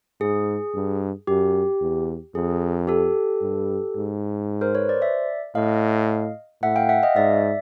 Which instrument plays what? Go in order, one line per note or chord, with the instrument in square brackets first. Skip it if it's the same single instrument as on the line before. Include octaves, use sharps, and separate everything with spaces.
[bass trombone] G#2 [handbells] G#4
[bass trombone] G2
[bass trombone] F#2 [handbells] G4
[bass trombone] E2
[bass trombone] F2 [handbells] G#4
[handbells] G4 A4
[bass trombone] G2
G#2
[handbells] A#4 C5
B4 C#5
C5 D5
D5 E5
[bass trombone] A2 [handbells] D#5 F5
[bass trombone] A2 [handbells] E5 F#5
[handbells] F5 G5
E5 F#5
D#5 F5
[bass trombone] G#2 [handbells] D5 E5